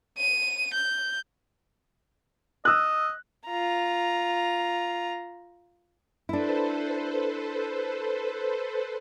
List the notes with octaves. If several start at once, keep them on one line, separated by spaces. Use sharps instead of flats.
D#7
G6
D#5 E6 F#6
F4 A#5
D4 E4 A4 B4 C5